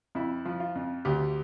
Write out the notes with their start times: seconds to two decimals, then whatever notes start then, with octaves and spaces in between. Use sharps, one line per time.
0.15 F2 E4
0.45 F3
0.60 F4
0.75 F2
1.05 D2 G4